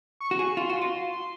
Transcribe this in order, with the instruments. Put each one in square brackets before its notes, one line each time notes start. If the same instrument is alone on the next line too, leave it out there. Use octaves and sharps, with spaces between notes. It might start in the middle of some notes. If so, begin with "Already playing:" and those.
[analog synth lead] C#6
[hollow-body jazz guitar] F#4
G#4
[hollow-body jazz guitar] F4 [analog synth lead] C6
[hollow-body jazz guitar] F#4
F4